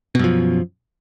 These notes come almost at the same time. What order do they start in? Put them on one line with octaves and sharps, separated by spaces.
B2 F#2 F3